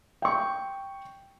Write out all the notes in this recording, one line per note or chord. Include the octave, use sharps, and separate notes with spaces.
G5 C#6